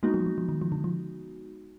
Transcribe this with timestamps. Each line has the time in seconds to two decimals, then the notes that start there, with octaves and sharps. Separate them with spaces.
0.03 G#3 A#3 B3 D#4 F#4
0.14 F#3
0.20 F3
0.26 F#3
0.38 F3
0.49 D#3
0.62 F3
0.72 D3
0.84 F3